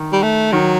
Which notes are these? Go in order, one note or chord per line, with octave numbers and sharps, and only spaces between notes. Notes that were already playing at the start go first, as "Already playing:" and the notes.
Already playing: D#3
G3
A3
D#3 F#3